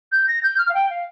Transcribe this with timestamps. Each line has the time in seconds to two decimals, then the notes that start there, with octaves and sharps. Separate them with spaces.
0.12 G6
0.28 A#6
0.43 G6
0.58 F6
0.69 F5
0.74 G5
0.90 F5